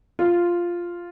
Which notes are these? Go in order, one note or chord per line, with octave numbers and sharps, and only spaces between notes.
F4